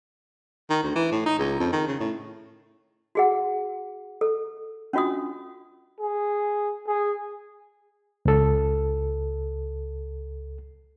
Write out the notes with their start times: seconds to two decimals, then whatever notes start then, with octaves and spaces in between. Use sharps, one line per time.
0.70 D#3
0.84 D2
0.96 E3
1.12 A2
1.26 D#4
1.38 C#2
1.60 F2
1.73 D#3
1.88 C#3
2.00 A2
3.15 F#4 G#4 F#5
4.21 A4
4.93 C#4 D4 F4 F#4 D#6
6.00 G#4
6.87 G#4
8.25 C#2 A4